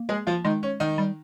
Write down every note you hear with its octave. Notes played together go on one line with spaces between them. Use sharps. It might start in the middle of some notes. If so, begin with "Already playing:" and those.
Already playing: A#3
G#3 G#4
F3 F4
D#3 G#3 D#4
C#4
D#3 D#4
G3